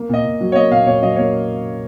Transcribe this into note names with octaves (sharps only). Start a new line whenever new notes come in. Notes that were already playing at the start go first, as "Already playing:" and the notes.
Already playing: A#3
A#2 D#5
A#2
F#3
C#5
A#3 D#5
A#2 F5
A#2 C#5
F#3 D#5
A#3 C#5